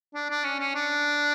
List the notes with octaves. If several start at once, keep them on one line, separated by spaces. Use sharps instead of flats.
D4
D4
C#4
C#4
D4